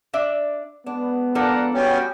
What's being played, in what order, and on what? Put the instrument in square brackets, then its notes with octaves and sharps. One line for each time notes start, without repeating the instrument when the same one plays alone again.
[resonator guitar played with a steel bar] D4 D5 E5
[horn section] G#3 B3 [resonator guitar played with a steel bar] D4
[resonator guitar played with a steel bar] F3 D4 A4 [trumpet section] A#4 D5 F#5
[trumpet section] G3 F#4 G5 [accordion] B3 C#4